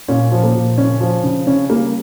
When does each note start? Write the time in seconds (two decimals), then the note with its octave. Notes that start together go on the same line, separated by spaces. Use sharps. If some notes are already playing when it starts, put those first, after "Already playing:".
0.08 A#2 C#4
0.31 F3
0.43 A#3
0.55 A#2
0.77 C#3 C#4
1.01 F3
1.23 C#3
1.47 C#3 C#4
1.69 G3 A#3